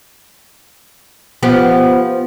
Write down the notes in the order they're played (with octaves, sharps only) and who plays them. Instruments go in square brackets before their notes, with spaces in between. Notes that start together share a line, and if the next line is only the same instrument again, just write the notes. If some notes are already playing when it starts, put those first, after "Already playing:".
[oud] F3 B3 G4